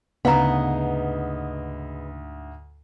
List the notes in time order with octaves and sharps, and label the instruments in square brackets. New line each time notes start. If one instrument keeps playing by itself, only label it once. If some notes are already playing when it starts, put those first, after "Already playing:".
[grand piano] D2 G#2 [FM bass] C#3 [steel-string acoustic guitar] B3 D#4 G#4 [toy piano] F5 A#5